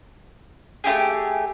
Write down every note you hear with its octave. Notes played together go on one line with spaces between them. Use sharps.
A3 E4 G4 G#4